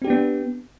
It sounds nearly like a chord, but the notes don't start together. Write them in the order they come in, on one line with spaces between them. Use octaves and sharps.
C4 G4 D4 B3